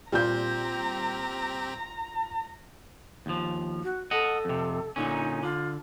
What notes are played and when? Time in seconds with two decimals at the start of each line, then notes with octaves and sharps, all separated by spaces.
0.12 A#2 G3 C4 F4 G4 A#5 G6
3.26 D#2 F3
3.83 F#4
4.11 A4 D#5 F#5
4.45 F2 C3
4.96 A#2 D3 C#4 D#4
5.43 D3 F4